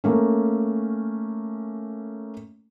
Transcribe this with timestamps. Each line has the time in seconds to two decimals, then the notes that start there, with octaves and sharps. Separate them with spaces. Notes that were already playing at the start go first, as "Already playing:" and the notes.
0.04 A3 A#3 C#4